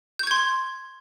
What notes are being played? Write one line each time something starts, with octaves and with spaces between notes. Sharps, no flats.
C6 C#6 G6 G#6